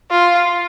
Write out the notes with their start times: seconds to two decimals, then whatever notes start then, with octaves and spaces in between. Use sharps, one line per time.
0.11 F4